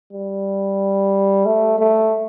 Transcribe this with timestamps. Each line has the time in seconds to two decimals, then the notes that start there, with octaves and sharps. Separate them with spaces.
0.13 G3
1.46 A3
1.79 A3